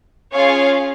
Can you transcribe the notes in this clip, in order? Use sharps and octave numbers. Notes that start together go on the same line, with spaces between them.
C#4 F4 G#4 C#5 F5